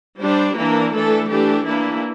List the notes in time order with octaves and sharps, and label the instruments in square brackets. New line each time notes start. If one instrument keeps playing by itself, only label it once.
[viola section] G3 D4 C5
E3 A#3 D4 A#4
E3 A3 D4 A4
E3 A3 D4 G4
E3 A#3 D4 E4